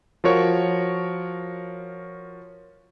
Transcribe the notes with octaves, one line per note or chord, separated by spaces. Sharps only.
F3 F4 F#4 A#4 C#5 C#6